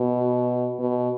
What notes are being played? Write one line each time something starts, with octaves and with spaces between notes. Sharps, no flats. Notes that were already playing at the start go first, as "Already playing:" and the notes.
Already playing: B2
B2